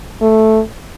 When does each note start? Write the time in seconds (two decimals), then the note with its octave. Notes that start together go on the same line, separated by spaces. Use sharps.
0.22 A3